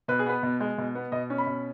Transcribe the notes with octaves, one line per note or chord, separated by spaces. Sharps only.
B2 B4
G#4
B3 B4
B2
G#3
B2
B3
B2 D#5
C#4
B5
B2